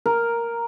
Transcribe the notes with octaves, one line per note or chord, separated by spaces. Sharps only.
A#4